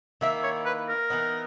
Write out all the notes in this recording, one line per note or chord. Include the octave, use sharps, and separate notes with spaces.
D#3 A#3 E4 E5
C#5
B4
A#4
E3 B3 D#4